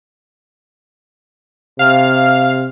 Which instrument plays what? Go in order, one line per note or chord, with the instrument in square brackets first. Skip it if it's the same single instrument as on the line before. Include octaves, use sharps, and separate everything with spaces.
[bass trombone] C3 [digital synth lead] F5